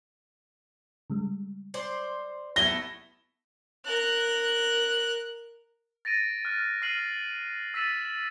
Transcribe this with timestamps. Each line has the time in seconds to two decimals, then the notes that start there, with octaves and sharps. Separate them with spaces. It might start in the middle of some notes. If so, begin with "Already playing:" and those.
1.10 C#3 G3 G#3
1.74 C5 D5
2.56 A3 B3 E4 A#6 G7
3.86 A#4 F#6
6.05 A6 A#6 D7 D#7
6.45 F6 F#6
6.82 F6 C7 D#7 F#7
7.74 E6 A6 B6 D#7 E7 F#7